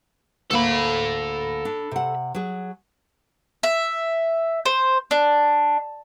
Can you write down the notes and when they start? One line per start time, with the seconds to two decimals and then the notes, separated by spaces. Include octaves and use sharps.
0.51 D2 A#3 A4 B5
1.65 D4
1.91 C3 F#5
2.35 F#3 G#4
3.63 E5
4.66 C5
5.11 D4